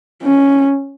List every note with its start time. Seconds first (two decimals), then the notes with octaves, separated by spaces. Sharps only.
0.23 C#4